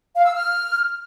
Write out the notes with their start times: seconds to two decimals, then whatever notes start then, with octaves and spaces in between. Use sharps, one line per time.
0.15 F5
0.25 E6
0.35 F6